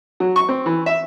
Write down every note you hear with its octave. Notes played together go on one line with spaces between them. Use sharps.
F#3
C#6
C4
E3
E5